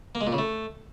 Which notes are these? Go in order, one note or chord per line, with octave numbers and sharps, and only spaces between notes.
A#3
G#3
A#2
C#3
A3